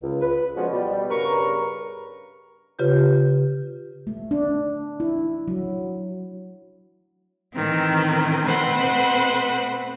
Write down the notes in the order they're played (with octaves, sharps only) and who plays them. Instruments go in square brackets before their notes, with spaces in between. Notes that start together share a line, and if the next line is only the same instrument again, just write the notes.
[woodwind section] C#2
B4
B2 D3 F3 G#3 C#4 F#4
B2 G3
G2 C#3 A#4 B4 A#5 C#6
[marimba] C#3 F4 G4 B4 G6
[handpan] A3
D4
E4
F#3
[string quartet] A2 D#3 E3 C4
B2 A3 C4 B4 C5 F#5